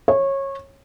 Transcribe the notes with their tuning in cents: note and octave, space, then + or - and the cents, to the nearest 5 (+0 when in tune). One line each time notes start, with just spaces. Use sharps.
C#5 -20